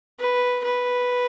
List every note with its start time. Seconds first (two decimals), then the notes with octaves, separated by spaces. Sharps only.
0.20 B4
0.64 B4